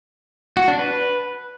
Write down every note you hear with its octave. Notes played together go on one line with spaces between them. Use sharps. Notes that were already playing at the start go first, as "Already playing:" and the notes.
F#4
D4
B4